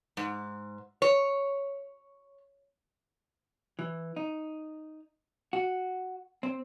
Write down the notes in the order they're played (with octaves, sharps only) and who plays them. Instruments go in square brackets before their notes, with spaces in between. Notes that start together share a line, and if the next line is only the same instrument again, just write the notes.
[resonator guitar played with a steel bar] G#2
C#5
[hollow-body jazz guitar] E3
D#4
F#4
C4